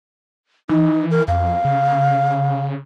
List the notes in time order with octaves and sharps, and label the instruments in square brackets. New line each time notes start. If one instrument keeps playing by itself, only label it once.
[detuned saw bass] E3 [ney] D#4
[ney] A#4
[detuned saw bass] F2 [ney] F5
[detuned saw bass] C#3